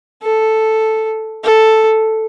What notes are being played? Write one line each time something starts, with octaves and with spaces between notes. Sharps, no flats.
A4
A4